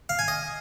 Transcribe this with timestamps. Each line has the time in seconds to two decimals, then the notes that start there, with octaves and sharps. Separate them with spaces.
0.09 F5
0.19 G#5
0.28 D#5